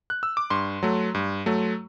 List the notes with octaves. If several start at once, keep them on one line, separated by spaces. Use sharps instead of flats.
F#6
E6
D6
G2 C6
F#3 A3
G2
F#3 A3